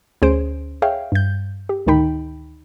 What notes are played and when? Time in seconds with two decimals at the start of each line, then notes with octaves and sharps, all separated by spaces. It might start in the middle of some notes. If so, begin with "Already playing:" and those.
0.22 D2 C#4 G#4 C5 D7
0.82 G#4 C#5 E5 F5 G5
1.12 G2 G6
1.69 G4
1.87 D2 A2 D#3 D#4 G5 B5